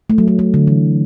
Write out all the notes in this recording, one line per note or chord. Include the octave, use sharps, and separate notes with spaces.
A3
F#3
A3
A3
D3
E3